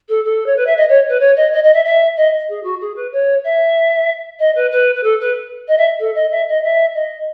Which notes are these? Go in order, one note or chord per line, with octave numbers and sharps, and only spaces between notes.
A4
A4
C#5
B4
E5
D#5
C#5
B4
C#5
D#5
D#5
D#5
E5
E5
D#5
G#4
F#4
G#4
B4
C#5
E5
D#5
B4
B4
B4
A4
B4
D#5
E5
A4
D#5
E5
D#5
E5
D#5